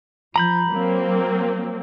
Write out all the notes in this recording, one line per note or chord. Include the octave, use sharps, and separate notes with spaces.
F3 A#5 B5 G6
F#3 A#3 C4